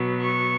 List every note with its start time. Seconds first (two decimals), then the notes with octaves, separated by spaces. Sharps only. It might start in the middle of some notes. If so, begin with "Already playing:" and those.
Already playing: B2 F#3 B3
0.21 C#6